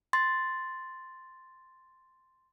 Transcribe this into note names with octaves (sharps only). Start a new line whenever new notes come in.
C6 A6